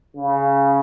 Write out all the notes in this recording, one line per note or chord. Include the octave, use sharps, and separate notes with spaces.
C#3